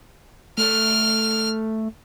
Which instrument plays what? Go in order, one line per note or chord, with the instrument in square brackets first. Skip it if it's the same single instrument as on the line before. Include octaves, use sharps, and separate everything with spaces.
[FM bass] A3 [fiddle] F6